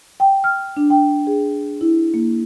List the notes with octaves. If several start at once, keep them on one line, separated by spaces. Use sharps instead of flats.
G5
F6
D4
G5
G#4
E4
A#3